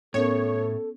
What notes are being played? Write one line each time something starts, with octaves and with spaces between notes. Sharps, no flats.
A2 B3 C#4 A4 A#4 C#5